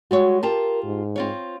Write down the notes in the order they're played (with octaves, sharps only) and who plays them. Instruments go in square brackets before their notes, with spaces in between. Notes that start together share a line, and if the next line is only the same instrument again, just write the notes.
[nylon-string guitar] G3 G#3 C#5 [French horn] F#4
[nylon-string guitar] F4 G4 A5 [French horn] A#4
[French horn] G#2
[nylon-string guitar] C4 F4 C#5